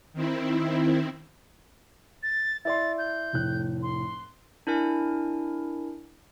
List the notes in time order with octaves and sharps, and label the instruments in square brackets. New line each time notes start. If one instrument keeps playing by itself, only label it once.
[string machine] D#3 C4 E4
[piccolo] A6
[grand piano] E4 D5 C6 [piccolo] A6
[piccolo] G6
[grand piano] F1 A2 F#6
[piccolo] C6
[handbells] D4 E4 A#4 G#5